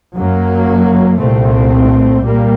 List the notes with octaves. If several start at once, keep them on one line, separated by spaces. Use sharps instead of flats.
F#2 F#3 A#3
C2 A#2 A3 C4
A#2 G3 A#3